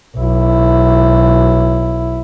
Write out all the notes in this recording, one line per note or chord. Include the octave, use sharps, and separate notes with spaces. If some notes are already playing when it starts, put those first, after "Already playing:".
B1 E4